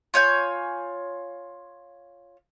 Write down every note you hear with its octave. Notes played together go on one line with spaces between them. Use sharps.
F4 C#5 G#5 G6